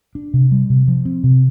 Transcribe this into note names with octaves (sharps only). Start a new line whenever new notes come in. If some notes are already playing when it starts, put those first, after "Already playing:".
D4
C3
G3
C3
F3
C4
C3